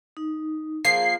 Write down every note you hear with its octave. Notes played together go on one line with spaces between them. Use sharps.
D#4
F3 A#3 G#4 C7